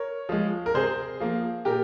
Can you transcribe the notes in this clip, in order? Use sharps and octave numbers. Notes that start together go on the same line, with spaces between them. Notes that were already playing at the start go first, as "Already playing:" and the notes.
Already playing: A#4 C#5
F3 G#3
A#4
C3 G#4 C5
F3 A#3
A#2 G4 A#4